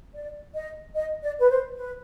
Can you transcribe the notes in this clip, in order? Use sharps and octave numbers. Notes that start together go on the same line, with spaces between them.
D5
D#5
D#5
D5
B4
C5
B4